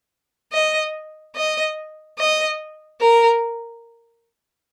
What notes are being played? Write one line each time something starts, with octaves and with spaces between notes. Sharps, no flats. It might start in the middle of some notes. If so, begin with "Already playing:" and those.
D#5
D#5
D#5
A#4